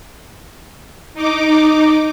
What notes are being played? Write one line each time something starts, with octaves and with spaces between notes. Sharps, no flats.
D#4 D6